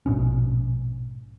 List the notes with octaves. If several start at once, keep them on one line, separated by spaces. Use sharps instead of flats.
A#1 G#2 B2 C#4